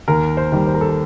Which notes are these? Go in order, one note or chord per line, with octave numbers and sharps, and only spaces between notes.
D#2 A#4
C5
D#3 G3
C5
A#4
A4
A#4